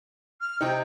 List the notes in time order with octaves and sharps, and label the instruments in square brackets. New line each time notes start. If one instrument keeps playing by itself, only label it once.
[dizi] F6
[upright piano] C3 D#4 [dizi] G5